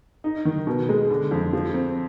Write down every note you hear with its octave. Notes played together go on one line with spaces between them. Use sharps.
D#4
D#3
B2
G#3
D3
F2
F3
C4